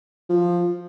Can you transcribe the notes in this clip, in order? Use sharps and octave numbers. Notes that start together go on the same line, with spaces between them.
F3